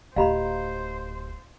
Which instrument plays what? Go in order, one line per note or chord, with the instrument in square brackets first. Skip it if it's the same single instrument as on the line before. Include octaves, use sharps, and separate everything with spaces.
[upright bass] D1 [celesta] G4 D#5 [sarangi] C5 [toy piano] F5 A#5 B5